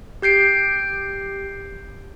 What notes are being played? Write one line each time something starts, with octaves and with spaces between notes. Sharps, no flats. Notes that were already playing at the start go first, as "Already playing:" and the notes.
G4 G6 C7 D7